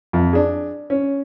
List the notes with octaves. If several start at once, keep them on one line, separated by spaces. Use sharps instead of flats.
F2
D4 G#4
C#4